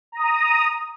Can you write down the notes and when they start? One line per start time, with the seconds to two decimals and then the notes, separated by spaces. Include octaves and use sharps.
0.12 A#5 D#6